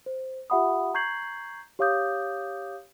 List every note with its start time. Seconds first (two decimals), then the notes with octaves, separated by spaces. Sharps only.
0.06 C5
0.50 F4 G4 E5 F#5 B5 D#6
0.94 A#5 C#6 G6 G#6 C7 F#7
1.79 G4 C#5 F5 D6 D#6 G6